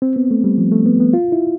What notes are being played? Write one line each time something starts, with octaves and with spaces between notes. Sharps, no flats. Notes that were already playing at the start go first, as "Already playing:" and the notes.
C4
B3
A3
G3
F3
A3
B3
B3
F4
E4